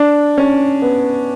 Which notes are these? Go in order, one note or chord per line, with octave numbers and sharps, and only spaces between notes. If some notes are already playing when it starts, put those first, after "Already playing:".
Already playing: D4
C#4
B3